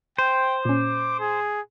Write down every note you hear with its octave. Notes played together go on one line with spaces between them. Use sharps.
C5 G5
A#2 C#4 D6
G#4